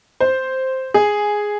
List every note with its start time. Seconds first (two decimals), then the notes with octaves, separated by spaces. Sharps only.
0.20 C5
0.94 G#4